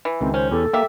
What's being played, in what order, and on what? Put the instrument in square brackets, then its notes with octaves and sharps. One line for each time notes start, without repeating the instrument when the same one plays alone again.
[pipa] E3
[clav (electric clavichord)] C#2 D#3 [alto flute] C4
[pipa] C#4 [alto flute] C5
[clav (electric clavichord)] E2 G4 [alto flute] A4
[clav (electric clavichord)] A#3 [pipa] G4 E5